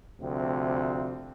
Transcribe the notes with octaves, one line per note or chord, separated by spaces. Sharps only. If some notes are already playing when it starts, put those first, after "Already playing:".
D2 C3 F3 C4